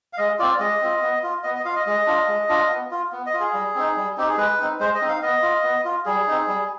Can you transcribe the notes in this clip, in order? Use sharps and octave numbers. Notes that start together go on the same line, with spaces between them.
F5
G#3 D#5
C4 F4 D5
G#3 D#5
C4 F4
B3
F4
B3 D#5
D#5
F4 F5
D#5
G#3 D#5
D4 F4
G#3
D4 F4
B3
F4
B3
D#5
F4
G#4
G3
C4 D#4
G3
C4 D#4 G4
G#4
G#3 B4
C4 D#4
G#3 C5
D#5
C4 D#4
F5
B3 D#5
F4
B3
F4
G3 G#4
C4 D#4
G3